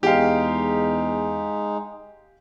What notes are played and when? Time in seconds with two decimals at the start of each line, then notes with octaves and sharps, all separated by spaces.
0.03 E2 G#3 D#4 G4 F5